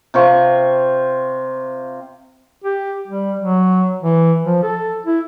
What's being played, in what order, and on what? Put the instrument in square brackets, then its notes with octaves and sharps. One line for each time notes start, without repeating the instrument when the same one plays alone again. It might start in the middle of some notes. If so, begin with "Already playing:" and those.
[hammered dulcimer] C3 F4 C#6
[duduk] G4
G3
F#3
E3
F3
A4
E4